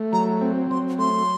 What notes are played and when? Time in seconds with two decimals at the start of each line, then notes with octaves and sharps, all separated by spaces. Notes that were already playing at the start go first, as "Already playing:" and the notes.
Already playing: A3
0.13 F#3 A#5
0.41 C4
0.70 F#3 C6
0.98 A3 C6